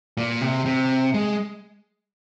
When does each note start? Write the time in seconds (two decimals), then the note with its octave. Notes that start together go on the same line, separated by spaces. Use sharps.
0.17 A#2
0.41 C3
0.66 C3
1.14 G#3